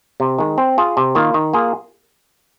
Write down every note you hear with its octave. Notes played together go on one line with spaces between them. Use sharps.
C3
D#3 G#3
C4
F4 G#4
C3
D#3 A#3 F4
D#3
A#3 F4 G#4